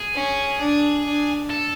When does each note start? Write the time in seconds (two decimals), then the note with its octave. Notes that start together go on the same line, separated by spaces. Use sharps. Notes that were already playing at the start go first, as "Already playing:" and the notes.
Already playing: G#4
0.14 C#4
0.60 D4
1.05 D4
1.50 A4